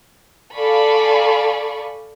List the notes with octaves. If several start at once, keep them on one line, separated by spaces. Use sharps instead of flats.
A4 D5 F5 G#5 B5 C#6